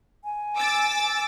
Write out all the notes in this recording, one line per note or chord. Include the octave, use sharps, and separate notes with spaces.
G#5
D6 E6 A6